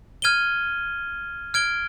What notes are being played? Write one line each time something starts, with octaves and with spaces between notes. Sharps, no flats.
F6 G#6 D#7 G7
F6 G#6 D7 G7